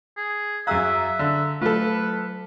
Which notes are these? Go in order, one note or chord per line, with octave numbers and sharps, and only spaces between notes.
G#4
F#2 G#4 E5 F5 A#5 E6 F#6
D3
F#3 A3 F4 A4 B4